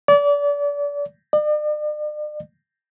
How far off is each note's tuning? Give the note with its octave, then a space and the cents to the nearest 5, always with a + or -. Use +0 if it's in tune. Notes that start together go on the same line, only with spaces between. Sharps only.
D5 -35
D5 +40